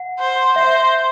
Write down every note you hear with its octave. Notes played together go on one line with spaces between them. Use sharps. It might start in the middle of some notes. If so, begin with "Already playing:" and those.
Already playing: F#5
C5
C5 E5